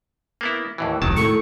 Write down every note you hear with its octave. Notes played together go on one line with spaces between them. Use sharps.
A#3 B3 E4
D#2 A2 E3
F1 C#2 D#3 F#3 A5
A2 A4 C#6